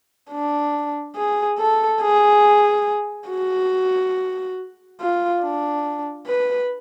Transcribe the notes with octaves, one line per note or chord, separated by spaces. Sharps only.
D4
G#4
A4
G#4
F#4
F4
D4
B4